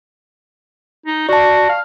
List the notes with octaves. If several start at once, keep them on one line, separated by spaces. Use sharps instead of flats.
D#4
F#4 D5 A5
F5